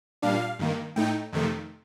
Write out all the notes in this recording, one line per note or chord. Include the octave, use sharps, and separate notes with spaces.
A#2 G3 D4 F5
G2 D#3 A#3
A2 A3 D#4 G5
F2 C3 D#3 A3